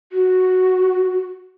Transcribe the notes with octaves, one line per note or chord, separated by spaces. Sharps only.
F#4